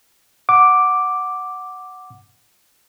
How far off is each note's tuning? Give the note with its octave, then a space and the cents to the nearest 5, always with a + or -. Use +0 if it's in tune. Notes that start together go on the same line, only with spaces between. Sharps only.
F#5 +0 D6 +0